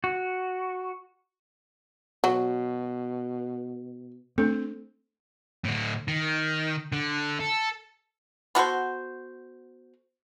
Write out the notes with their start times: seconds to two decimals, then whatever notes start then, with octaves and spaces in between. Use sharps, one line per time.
0.04 F#4
2.24 B2 F#3
4.38 A3 C4 D4 A4
5.65 A2 D3
6.08 D#3
6.92 D3
7.40 A4
8.55 B3 F#4 A4 C5